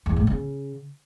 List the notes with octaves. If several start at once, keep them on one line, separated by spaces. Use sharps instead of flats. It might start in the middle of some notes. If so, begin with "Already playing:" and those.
E2
A2
C#3